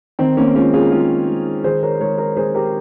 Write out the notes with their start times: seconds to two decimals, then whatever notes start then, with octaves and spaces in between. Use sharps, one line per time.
0.19 D#3 C4
0.37 A#3 C#4
0.55 G#3 C#4 F4
0.73 F4 G#4
0.92 G#3 F4 G#4
1.28 G#3
1.64 D#3 G#4 C5
1.83 A#4 C#5
2.00 G#3 A#4 C#5
2.18 A#4 C#5
2.36 G#3 G#4 C5
2.55 G4 A#4